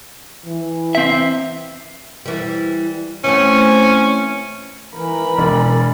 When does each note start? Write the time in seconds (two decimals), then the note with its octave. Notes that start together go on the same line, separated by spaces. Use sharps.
0.46 E3
0.95 C4 E5
2.26 E3 G3
3.24 E3 A3 C4 C#4
4.95 E3 A#4 B5
5.38 E1 D5